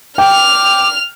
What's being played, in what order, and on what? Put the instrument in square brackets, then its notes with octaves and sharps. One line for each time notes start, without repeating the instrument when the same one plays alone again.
[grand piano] G5 [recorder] D6 [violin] F6 F7